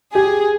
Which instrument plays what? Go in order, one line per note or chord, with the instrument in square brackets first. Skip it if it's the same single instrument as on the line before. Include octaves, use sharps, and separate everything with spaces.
[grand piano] G4 [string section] G#4